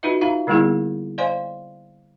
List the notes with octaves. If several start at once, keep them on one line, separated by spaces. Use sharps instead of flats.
D#4 F4 F#4 B4 D#5 E5
D#4 F4 E5 F5 A#5
D3 G3 A#3 B3 E4 G#4
C5 D5 D#5 F5 G#5 C6